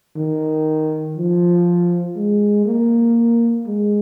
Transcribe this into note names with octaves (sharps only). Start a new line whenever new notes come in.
D#3
F3
G#3
A#3
G#3